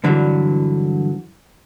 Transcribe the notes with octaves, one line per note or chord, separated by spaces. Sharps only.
G2 D3 E3 F#3